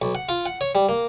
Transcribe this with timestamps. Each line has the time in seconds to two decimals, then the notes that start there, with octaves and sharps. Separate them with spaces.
0.02 B1
0.15 F#5
0.29 F4
0.46 F#5
0.61 C#5
0.75 G3
0.89 A#3